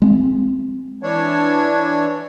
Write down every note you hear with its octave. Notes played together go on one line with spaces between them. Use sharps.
G#3 C4
E3 D4 C#5